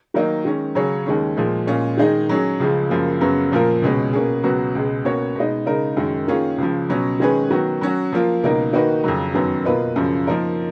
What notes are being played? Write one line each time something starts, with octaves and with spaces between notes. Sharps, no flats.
D#3 F#3 A#3 D#4
D#3 G#3 C#4
C#3 F#3 C#4 G#4 C#5
D#2 D#3 G#3 C#4
A#2 F3 G#3
A#2 G#3 C#4 F4 G#4
D#3 G#3 D#4 G#4 D#5
F#3 C#4 G#4
C#2 C#3 F3 G#3
F#2 C#3 F3 A#3
F#2 C#3 F#3 B3
A#2 F3 A#3 F4 A#4
C#2 B2 G#3 C#4
B2 A#3 C#4 G#4
C#2 B2 F#3 B3 F#4
C#2 B2 G#3
B2 A#3 C#4 F#4 C#5
B2 G#3 D#4
C#3 G#3 D#4 A#4
F#2 D#3 G#3
D#3 A#3 C#4 F4 G#4
C#2 C#3 F3
B2 F#3 C#4
D#3 G#3 C#4 G#4 B4
D#3 F#3 B3 F#4
F#3 C#4 F#4
F3 A#3 F4
C#2 B2 A#3 D#4 A#4
D#3 A#3 D#4 F#4 B4
F2 C#3 F#3
F#2 D#3 F#3 B3
B2 A#3 F4 B4 D#5
F#2 C#3 F3
F3 A#3 D#4 A#4